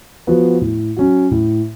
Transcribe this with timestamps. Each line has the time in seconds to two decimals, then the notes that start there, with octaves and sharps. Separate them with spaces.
0.27 F3 B3 F#4
0.61 A2
0.96 F#3 C#4 F#4
1.31 A2